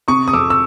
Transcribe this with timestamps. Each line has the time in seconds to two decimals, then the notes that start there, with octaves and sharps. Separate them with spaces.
0.08 C3 C#6 D#6
0.28 D#6
0.33 F2 D6 E6
0.50 E6